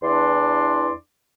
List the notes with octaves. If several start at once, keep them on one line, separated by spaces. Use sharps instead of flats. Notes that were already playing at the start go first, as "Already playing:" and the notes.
E2 E3 D4 D5 C6